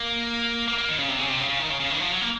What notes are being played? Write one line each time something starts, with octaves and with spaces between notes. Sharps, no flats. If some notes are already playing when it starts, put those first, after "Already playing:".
Already playing: A#3
A#3
A#3
D#3
C#3
C3
C#3
C3
C#3
C#3
D#3
C#3
C#3
D#3
F3
F#3
A#3